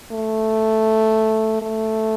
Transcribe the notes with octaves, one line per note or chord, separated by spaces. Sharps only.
A3
A3